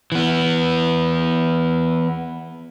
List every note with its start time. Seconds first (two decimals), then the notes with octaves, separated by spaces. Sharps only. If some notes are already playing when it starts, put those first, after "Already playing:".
0.12 E3 B3